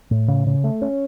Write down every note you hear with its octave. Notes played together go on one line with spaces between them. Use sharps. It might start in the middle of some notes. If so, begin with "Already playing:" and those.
A2
C#3
C#3
A3
C#4